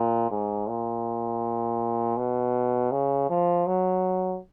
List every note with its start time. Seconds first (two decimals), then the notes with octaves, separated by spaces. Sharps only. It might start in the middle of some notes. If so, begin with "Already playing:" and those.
Already playing: A#2
0.31 G#2
0.68 A#2
2.17 B2
2.91 C#3
3.30 F3
3.66 F#3